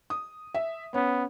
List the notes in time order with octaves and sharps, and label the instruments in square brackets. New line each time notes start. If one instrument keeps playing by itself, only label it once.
[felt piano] D#6
E5
[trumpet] B3 [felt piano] C#4